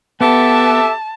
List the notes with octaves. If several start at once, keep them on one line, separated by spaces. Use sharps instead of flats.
B3 G4 A4 E5 A5